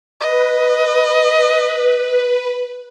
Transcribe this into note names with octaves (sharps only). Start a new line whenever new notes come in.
B4 D#5